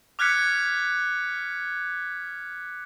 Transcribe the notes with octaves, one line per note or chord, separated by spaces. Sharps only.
D6 F6 F#6 G#6 B6 C#7